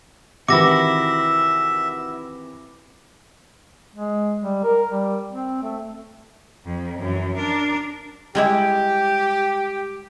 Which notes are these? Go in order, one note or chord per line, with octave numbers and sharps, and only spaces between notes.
C3 D#3 E3 E4 F#4 E5 D6 A#6
G#3
G3
A#4
G3
C4
A3
F2
F#2 E3
D4 A#4
G3 G#3 E4 G4